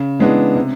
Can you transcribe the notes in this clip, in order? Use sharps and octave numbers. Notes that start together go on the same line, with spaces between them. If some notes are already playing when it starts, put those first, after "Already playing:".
Already playing: C#3
E3 G#3 B3 D4
C3